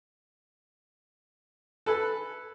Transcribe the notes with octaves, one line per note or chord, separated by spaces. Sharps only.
A4 B4 G#5 A5